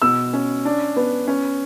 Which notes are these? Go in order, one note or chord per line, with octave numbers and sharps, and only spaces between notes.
B2 E6
C#4
D4
B3
C#4